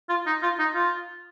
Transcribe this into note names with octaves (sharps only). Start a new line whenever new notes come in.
F4
D#4
F4
D#4
F4